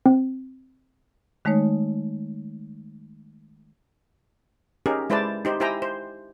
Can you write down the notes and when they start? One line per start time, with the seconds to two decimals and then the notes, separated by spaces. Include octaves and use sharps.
0.06 C4
1.45 D#3 G#3 A3 D#4 C#5
4.86 C#4 D#4 G4 G#4 A#4
5.10 G#3 E4 B4 C5 D5 A5
5.45 D#4 G4 C5
5.60 E4 G4 C5 G5 G#5 A#5
5.82 C5